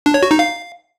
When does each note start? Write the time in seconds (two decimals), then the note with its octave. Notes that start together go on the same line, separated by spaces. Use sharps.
0.06 D4
0.14 C#5
0.23 F#4
0.31 D#4
0.39 F5